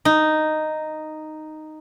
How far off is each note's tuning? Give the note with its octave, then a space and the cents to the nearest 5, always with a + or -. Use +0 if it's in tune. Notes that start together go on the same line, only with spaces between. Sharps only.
D#4 -5